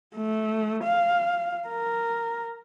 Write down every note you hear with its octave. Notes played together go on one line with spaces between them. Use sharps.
A3
F5
A#4